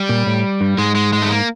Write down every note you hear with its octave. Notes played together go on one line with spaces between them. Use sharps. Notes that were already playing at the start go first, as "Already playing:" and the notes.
Already playing: G3
A#2
A2
G2
G#2 G#3
G#3
G#3
A3
A#3